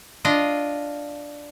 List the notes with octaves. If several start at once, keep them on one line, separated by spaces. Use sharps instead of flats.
D4 F4 D#5